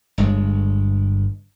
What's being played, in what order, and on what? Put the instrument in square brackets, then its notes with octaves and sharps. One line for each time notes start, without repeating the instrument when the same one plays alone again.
[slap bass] G1 G2 G#3